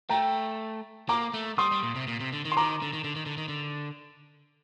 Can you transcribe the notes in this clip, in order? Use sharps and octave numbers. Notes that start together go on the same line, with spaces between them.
A3 G5 A#5
A#3 A#5 D6
A3
G3 C6 D#6
G3
A#2
C3
A#2
C3
D3
D#3
C6
D#3 A#5 D6
D3
D#3
D3
D#3
D3
D#3
D3